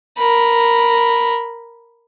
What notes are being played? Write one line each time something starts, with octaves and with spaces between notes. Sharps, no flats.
A#4 B5